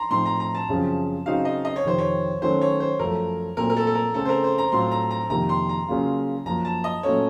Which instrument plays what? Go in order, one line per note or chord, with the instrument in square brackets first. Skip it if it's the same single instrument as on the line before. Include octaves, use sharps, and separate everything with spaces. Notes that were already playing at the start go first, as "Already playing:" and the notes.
Already playing: [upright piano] A#5 C6
[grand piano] A2 F3 C4 D#4 [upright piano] C6
[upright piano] A#5
A#5
A5
[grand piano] F#2 C#3 F3 C4
[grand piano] C#3 F#3 C4 D#4 F#4 [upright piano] F5
[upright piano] D#5
D#5
C#5
[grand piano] F2 C3 D#3 [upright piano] C5
[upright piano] C#5
[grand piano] D#3 F#3 A3 C#4 F#4 [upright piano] C5
[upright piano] C#5
C5
[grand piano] F#2 F3 A3 [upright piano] A#4
[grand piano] A#2 F#3 A3 C4 [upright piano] A#4
[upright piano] A#4
A4
A4
A#4
[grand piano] C#3 A3 C4 [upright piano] A4
[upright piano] C5
A#4
C5
A#5
[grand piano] A2 F#3 C4 F4 [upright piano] C6
[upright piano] A#5
A#5
[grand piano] F2 C3 D#3 A#3 [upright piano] A#5
[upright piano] C6
A#5
[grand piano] C#3 F#3 A#3 F4
[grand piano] F#2 F3 A#3 [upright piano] A#5
[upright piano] A5
D#5
[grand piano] A#2 F#3 A3 C#4 F4 [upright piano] C#5